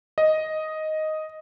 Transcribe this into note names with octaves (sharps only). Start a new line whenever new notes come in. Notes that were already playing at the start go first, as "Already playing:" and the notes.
D#5